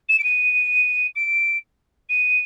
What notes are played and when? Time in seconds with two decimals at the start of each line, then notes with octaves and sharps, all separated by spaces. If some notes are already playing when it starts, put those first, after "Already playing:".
0.09 E7
0.19 D7
0.24 D#7
1.15 D7
2.09 D#7